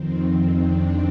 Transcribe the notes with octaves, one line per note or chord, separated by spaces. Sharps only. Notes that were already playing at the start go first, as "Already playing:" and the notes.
Already playing: F2 D#3 C4
C4
D4